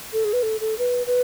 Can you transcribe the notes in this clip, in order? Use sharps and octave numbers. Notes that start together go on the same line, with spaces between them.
A4
G#4
B4
A4
A4
B4
B4